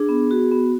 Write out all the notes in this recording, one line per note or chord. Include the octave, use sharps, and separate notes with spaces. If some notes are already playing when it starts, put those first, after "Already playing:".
Already playing: D4 G#4
B3
F#4
B3